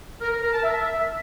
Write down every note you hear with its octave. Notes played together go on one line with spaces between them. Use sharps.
A#4
A#4
A#4
A5
E5